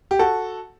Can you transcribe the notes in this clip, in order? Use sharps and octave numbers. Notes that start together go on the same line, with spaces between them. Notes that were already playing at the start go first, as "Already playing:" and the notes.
G4
F#4 A4